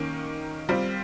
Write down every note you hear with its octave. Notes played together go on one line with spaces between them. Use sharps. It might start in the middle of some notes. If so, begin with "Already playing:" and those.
Already playing: D#3 A#3 C#4
G3 C4 F4